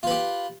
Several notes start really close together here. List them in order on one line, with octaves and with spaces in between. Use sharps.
F4 B4 G4